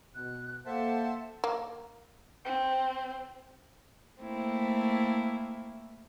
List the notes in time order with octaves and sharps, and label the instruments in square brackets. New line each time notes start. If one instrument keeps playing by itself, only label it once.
[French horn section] B2 [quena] F#6
[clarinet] A#3 [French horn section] A4 [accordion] C5 E5 A5 [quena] F#5
[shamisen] A#3
[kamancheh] C4
[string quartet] A3 A#3 C4 E4